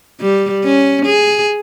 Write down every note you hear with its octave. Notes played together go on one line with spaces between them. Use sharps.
G3
C#4
G#4